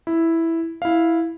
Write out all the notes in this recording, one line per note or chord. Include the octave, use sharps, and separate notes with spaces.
E4
E4 F5